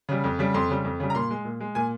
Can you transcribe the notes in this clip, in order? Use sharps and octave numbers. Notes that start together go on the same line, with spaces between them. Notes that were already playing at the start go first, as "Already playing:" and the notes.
C#3 G3
F2
C#3 G3
F2 C6
C#3 G3
F2
C#3 G3
A#5
A#2 C6
G#3
A#2
G#3
A#2 G#5